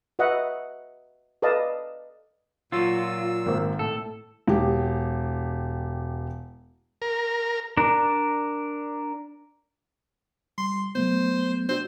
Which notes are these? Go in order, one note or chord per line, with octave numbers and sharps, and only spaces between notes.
F#4 B4 D#5 E5 F#5
A4 B4 D5 D#5 F5 A5
A#2 F#3 F4 E6
G#1 A#3 C5
A2 A4
E1 G4
A#4
D4 A#4
G3 C6
F#3 A3 B3 C5
D4 F#4 C5 D5